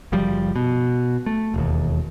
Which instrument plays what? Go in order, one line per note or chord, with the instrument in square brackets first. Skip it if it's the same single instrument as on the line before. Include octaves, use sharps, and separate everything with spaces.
[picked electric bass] F#1 F3 G3
B2
A3
E1 D#2